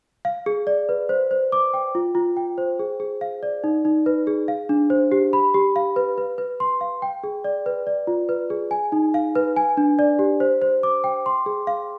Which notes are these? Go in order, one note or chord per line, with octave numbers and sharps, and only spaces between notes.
F5
G#4
D5
B4
C5
C5
D6
G5
F4
F4
G5
C5
G#4
G#4
F5
D5
D#4
D#4
B4
G#4
F5
D4
C5
G4
B5
G4
F5
B4
B4
B4
C6
F5
G5
G#4
D5
B4
D5
F4
B4
G#4
G#5
D#4
F5
B4
G#5
D4
D5
G4
C5
C5
D6
G5
C6
G#4
F5